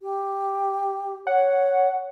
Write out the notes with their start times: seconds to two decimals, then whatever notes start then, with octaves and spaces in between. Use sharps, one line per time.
0.01 G4
1.27 C#5 F#5